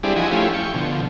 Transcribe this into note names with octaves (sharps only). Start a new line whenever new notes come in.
G3 C4 D4 E4 G4 G#4
F3 E4 F#4 D#5 G#5
A3 C#4 E4 F4 G4
G5 C#6
B2 D3 F3